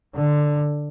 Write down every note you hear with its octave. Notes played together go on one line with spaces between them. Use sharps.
D3